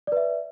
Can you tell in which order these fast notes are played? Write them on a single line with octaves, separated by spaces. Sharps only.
D5 B4 E5